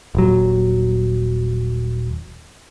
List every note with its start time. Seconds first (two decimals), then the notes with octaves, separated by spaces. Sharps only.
0.15 D#1 F#3